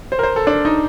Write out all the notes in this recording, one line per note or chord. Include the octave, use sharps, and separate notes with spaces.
C5
A#4
C5
A4
D4
D#4